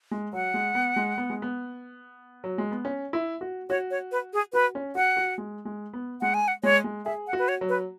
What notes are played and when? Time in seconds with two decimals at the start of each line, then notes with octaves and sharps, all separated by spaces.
0.11 G#3
0.33 F#3 F#5
0.54 G#3
0.75 B3
0.96 G#3
1.18 B3
1.30 G#3
1.42 B3
2.44 F#3
2.58 G#3
2.71 B3
2.85 C#4
3.13 E4
3.41 F#4
3.70 F#4 C#5
3.91 C#5
4.12 B4
4.33 G#4
4.53 F#4 B4
4.75 C#4
4.95 F#4 F#5
5.17 F#4
5.38 G#3
5.65 G#3
5.93 B3
6.21 G#3 F#5
6.34 G#5
6.48 F#5
6.63 G#3 C#5
6.84 G#3
7.05 G#4 E5
7.27 F#5
7.33 F#4
7.38 B4
7.48 C#5
7.61 F#3
7.69 B4